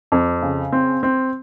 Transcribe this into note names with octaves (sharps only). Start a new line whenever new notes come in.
F2
C#3
C4
C4